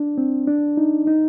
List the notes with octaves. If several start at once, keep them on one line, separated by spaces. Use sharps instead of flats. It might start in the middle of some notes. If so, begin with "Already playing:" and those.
Already playing: D4
C4
D4
D#4
D#4